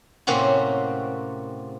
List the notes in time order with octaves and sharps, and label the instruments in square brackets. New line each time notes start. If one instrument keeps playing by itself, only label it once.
[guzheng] A2 C3 A#3 C4 C#4 F#4